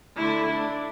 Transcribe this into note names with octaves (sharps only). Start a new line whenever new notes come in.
D3 A3 D4 E4
D4